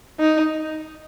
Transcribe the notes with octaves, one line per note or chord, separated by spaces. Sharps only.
D#4